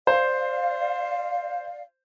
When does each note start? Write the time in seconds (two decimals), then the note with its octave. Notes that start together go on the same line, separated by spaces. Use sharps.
0.07 C5 D5 F5